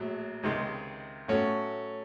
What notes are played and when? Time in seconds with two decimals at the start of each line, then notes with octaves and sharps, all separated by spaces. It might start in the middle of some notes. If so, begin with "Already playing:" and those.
Already playing: A#1 A2 F#3
0.43 C#2 C3 D#3 G#3
1.28 A2 F#3 A3 C#4 F#4